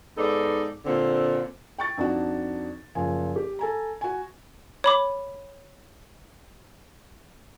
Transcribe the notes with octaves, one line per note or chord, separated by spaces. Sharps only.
G#2 B3 D#4 A4 D5
A#2 D3 C4
G5 C#6 A6
F2 D4 D#4 F#4
F#1 F3 G#5
G4
A4 G#5 A#5
F#4 G#5
C#5 B5 D6